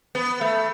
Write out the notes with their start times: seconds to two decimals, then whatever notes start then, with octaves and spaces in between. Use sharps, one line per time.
0.15 B3
0.41 A3